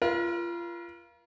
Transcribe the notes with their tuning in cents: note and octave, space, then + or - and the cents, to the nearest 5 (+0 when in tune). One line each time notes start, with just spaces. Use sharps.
F4 -25 A#4 +45